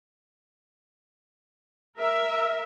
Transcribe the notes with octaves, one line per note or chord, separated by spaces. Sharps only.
A#4 E5